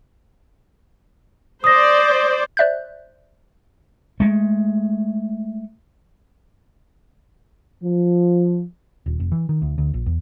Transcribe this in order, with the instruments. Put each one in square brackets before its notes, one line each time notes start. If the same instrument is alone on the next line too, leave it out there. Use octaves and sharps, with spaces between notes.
[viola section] C5 D5 [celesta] D#6 A#6
[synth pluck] C5 D5 E5 F#6 G6
[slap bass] G#3 A3
[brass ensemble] F3
[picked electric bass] D#1
F1
E3
D#3
D2
D2
A#1
E2